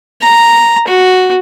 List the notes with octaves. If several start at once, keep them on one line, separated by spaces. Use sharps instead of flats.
A#5
F#4